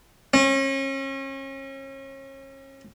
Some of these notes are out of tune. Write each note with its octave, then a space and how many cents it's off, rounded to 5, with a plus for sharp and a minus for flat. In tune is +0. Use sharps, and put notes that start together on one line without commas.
C#4 -35